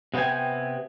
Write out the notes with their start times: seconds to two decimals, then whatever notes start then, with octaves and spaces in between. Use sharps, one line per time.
0.14 C3 B3 C4 G5 G#5